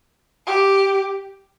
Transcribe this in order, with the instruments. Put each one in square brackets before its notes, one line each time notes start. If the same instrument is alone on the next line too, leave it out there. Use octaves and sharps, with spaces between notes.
[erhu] G4